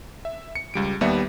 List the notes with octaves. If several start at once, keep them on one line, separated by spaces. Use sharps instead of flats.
E5
C#7
C#2 G3 D7
D#2 G3 B3 D5 E5 C#7